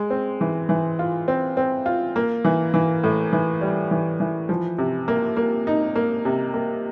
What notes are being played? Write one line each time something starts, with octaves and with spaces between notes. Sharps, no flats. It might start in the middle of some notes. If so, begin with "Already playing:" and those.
Already playing: G#3
C4
E3
E3
F4
C4
C4
F4
A#3
E3
E3
A2
E3
G3
E3
E3
F3
C3
A#3
A#3
D#4
A#3
C3
A#3